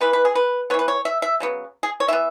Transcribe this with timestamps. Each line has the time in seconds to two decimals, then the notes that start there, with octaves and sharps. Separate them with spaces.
0.01 E3 B3 B4
0.13 B4
0.25 G#4
0.35 B4
0.70 B3 C#5
0.74 E3 B4
0.88 C#5
1.05 E5
1.22 E5
1.40 C#3 F#3 B3
1.83 G#4
2.00 C#5
2.08 E3 B3 E5